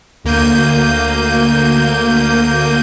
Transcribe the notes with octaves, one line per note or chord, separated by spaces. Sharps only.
D2 A#3 G6 D#7